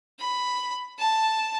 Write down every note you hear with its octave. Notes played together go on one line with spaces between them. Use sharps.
B5
A5